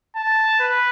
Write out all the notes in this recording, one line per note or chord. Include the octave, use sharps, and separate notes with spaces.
A5
B4